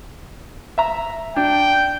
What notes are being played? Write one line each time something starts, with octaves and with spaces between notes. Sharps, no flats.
E5 A#5
D4 G5